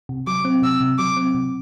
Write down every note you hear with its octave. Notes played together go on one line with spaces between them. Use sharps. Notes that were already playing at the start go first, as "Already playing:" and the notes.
C3
F#3 D6
C4
C3 E6
C3
F#3 D6
C4
C3